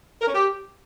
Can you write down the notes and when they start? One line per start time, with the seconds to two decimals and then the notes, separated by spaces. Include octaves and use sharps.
0.21 A#4
0.27 C#4
0.33 G4